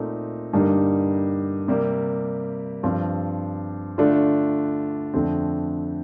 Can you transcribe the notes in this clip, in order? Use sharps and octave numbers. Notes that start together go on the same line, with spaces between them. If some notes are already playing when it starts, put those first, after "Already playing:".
Already playing: A#2 A3 C4 D#4
G2 D3 G3 A#3 D#4
C3 G3 A#3
G2 F3 C4 F4
D3 A3 D4 F4
F2 D3 A3 C4